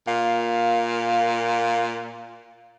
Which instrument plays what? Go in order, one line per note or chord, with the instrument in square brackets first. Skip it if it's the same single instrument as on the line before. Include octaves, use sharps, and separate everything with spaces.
[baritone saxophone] A#2 [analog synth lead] F5